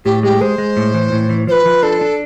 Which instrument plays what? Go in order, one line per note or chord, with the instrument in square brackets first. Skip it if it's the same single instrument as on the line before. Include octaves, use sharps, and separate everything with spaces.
[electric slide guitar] A2 [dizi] G4
[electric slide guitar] G#3 [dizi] G4
[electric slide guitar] G#3 [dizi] C5
[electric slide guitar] G#3
A2
E3
A2
E3
[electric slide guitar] F3 [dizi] C5
[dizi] B4
[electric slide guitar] F3
[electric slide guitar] D4 [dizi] A4
[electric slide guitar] D4